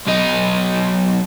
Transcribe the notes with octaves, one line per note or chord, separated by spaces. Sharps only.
B1 D#4